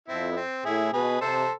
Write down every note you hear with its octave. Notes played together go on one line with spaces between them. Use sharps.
F2 C4 E4
B3
C4
A2 E4 G#4
B2 G#4 B4
C3 A4 C5